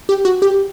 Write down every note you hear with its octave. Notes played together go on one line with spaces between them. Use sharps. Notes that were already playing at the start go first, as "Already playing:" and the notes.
G4
F#4
G4